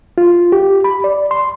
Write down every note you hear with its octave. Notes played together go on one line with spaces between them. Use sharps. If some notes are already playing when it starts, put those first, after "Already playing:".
F4
G4
B5
D5
C6